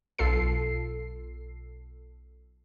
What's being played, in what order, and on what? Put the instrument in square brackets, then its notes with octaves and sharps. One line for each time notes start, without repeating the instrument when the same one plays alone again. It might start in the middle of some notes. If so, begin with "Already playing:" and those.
[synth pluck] B1 F4 A4 C7